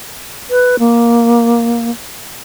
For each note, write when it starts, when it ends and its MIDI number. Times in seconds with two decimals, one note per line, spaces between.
0.50 0.76 71
0.79 1.90 58